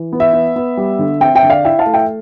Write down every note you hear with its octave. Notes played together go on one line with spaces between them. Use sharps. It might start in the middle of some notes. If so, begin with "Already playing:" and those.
Already playing: E3
B3
E5
B3
B3
G3
D3
C4 E5 G5
E5 G5
D3
D5 F5
E4 E5 G5
F5 A5
A3
E5 G5